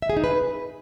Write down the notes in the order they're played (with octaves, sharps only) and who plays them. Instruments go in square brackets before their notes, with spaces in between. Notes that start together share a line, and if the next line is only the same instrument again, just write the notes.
[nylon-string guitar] E5
G#4
D#4
B4